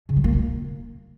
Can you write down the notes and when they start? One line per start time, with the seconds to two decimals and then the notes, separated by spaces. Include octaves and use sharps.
0.09 C#3
0.16 F#3
0.24 A#3
0.32 B2
0.39 A#3